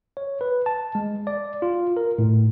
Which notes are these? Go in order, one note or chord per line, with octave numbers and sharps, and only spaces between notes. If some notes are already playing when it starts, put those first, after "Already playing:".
C#5
B4
A5
G#3
D5
F4
A#4
A2